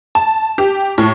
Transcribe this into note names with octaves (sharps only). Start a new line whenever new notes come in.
A5
G4
A2